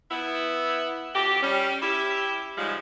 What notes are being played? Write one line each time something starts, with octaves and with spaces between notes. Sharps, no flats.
B3 E4
F2 F#4 G4
G3 C#4
E4 G4
G#2 C#3 F3 G3 G#3